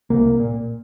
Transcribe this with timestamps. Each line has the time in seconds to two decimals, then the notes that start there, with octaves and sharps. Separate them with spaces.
0.10 C2 A#3
0.40 A#2